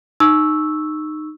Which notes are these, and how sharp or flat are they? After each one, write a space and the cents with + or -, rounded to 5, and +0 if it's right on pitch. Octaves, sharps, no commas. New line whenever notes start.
D#4 -20 C#6 +0 E6 -5